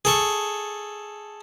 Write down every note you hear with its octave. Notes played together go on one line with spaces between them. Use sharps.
G#4 A4 C#6